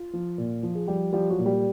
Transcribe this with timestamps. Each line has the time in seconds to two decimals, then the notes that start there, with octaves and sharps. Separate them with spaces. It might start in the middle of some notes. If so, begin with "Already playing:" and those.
Already playing: F4
0.13 F3
0.38 A#2
0.63 F3
0.75 G#4
0.88 F3 G3 G4
1.13 F3 G3 G4
1.30 F#3 F#4
1.39 A#2
1.46 G3 G4